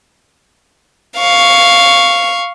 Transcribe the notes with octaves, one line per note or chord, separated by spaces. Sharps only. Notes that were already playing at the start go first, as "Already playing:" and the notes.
F5 C#6